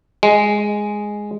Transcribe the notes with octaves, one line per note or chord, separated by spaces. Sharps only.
G#3